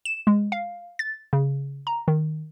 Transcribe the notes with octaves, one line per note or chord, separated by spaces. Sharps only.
E7
G#3
F5
A6
C#3
A#5
D#3